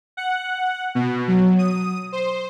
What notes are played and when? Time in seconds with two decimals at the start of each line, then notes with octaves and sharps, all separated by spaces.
0.17 F#5
0.95 B2
1.28 F#3
1.59 D#6
2.12 C5